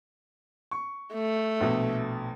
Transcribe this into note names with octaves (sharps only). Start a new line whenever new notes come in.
C#6
A3
A#1 B2